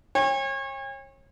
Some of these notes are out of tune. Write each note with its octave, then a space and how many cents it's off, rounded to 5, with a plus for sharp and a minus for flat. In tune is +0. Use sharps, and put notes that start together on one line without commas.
C#5 -30 G5 +45